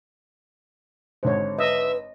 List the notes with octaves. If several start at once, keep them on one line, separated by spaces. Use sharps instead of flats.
G#1 D3 G#3 C5 C#5
B4 D#5 E5